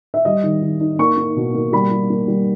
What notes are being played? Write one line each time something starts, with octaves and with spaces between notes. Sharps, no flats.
E5
G3 D#5
D#3
D#3
D#4
A#3 C#6
A#3
B2
A#3
G3 B5
G3
A#3
G3